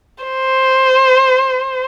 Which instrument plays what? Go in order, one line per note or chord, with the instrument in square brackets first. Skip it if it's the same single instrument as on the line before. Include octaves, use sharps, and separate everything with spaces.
[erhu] C5